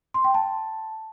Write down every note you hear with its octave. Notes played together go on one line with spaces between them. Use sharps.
C6
G5
A5